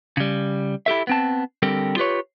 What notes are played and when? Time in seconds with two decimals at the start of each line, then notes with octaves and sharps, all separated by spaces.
0.17 C#3 G3
0.86 E4 G4 A4 E5
1.07 B3 C4 A5
1.62 D3 G3 C4 G4 A4 A#4
1.97 F4 G4 B4 C#5